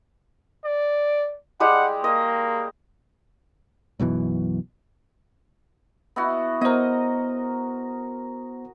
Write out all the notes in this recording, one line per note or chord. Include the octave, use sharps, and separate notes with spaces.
D5
G3 G#3 G4 F#5
A#3 D#5
B1 F#2 B2 E3
B3 E4 F#4
B3 A#4 C5 D#5